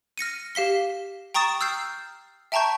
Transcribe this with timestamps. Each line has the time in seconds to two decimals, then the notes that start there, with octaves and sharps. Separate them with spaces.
0.18 F6 A#6 C#7 D#7
0.55 G4 F5 B6 G7
1.34 G5 A#5 C#6 D#6 A6 E7
1.61 E6 F6 G6 C7
2.52 E5 G5 A5 A#5 C#6 G6